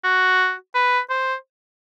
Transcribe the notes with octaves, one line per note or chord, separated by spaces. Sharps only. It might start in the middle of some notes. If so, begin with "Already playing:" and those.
F#4
B4
C5